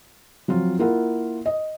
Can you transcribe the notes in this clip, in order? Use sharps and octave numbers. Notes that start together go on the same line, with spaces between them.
F3 F#3 C4 F4
A#3 E4 F4 A#4 F#5
D#5